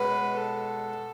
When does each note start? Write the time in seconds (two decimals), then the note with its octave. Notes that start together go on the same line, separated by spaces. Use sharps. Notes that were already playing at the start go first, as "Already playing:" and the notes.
Already playing: B2 G#3 C#4 B4
0.38 A4